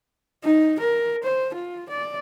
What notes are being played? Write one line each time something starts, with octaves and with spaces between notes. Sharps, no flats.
D#4
A#4
C5
F4
D5